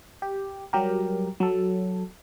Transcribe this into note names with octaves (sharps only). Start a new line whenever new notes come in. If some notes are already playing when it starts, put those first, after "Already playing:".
G4
F#3 G3 G4 A#4
F#3 A4